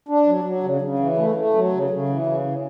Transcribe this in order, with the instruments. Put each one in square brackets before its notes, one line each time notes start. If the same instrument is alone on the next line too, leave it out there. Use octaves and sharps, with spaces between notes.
[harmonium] D4
F#3
F#3
C#3
C#3
E3
A3
A3
F#3
C#3
C#3
E3
C#3